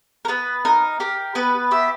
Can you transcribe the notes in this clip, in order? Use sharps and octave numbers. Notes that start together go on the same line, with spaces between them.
A#4
B3 B4
D#4 A#4
G4 A#4
B3 B4
G4 E5